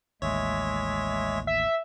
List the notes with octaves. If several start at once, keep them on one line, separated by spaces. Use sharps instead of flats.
A1 D#2 G#3 C#5 E5
E5